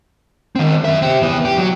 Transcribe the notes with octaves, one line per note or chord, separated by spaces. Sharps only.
D#3 C4
F#2 E5
C4 G4
E3 B3
G4
F#3